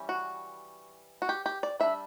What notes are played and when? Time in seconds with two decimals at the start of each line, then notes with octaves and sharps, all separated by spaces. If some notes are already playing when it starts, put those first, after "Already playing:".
Already playing: E3 G3 C#4
0.09 F#4
1.22 F#4
1.29 G4
1.46 G4
1.63 D5
1.80 G3 D4 E5